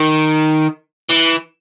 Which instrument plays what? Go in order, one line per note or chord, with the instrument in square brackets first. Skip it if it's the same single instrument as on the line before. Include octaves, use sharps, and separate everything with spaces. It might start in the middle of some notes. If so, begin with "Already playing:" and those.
Already playing: [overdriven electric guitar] D#3
E3